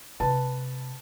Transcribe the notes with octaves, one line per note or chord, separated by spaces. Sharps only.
C3 B4 A5